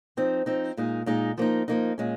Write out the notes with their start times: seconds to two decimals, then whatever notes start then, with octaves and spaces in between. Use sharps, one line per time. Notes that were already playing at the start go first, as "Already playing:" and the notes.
0.17 F3 C4 D#4
0.46 F3 C4 D#4
0.77 A#2 G#3 D#4
1.06 A#2 G#3 D#4
1.38 F3 A#3 D#4
1.68 F3 A#3 D#4
1.98 A#2 G#3 C#4